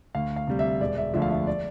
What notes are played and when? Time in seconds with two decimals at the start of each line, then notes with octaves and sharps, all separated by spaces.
0.15 D2 F5
0.36 F5
0.47 C3 G3
0.59 E5
0.81 E1 D5
0.97 E5
1.14 D2 D3 F3 E5
1.22 F5
1.30 E5
1.47 D5